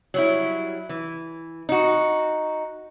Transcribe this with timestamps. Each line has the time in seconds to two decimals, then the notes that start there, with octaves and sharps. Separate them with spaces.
0.14 F#3 G3 E4
0.89 E3
1.69 D#4 F#4